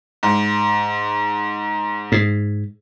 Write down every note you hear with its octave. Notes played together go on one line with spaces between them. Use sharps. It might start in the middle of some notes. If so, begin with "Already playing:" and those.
G#2
G#2